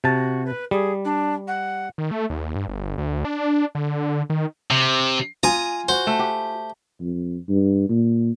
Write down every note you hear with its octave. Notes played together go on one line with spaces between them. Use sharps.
C3 F#4 A5
B4
G3 G#4
D4
F#5
D#3
A3
D#2
G2
G1
D2
D4
D3
D#3
C3
F4 G#5 A#5 D#6
F#4 C5
A3
G4
F2
G2
A#2